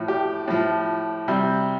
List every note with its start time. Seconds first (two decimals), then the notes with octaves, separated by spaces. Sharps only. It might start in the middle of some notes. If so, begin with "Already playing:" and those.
Already playing: A2 F3
0.08 G4
0.48 A2 F3
1.28 C3 G3